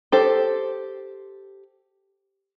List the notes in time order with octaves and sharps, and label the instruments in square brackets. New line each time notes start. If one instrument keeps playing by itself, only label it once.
[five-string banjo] G4 A4 C5